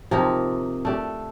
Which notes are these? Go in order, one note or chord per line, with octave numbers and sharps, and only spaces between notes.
C3 F3 A#3 D#4
A3 D4 G4